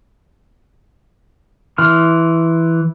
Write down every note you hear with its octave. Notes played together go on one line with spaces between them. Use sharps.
E3 C6 F6